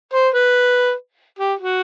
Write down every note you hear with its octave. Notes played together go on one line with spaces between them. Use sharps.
C5
B4
G4
F#4